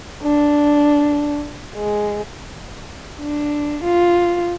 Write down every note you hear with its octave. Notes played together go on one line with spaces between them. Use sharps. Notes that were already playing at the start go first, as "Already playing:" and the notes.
D4
G#3
D4
F4